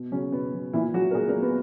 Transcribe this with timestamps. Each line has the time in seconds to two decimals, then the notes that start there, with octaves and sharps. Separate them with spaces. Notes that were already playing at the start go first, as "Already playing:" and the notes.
Already playing: B2
0.12 C#3 F#3 C#4
0.32 B2 B3
0.53 F#3
0.73 A#2 E3 E4
0.94 F#3 F#4
1.11 A#4
1.14 A#2 G#3 G#4
1.29 A#3 A#4
1.35 F#3
1.42 B3 B4